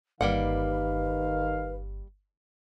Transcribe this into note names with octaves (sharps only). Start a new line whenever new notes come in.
G1 D#3 G3 A#3 B4 F5 F#5